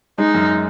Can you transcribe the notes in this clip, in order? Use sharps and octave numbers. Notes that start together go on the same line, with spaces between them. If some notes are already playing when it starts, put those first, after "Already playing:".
G#3 D#4
F#2